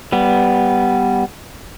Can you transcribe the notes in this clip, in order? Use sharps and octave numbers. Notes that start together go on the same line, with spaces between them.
G3 B3